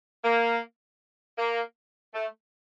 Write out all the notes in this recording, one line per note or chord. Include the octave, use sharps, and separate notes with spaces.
A#3
A#3
A3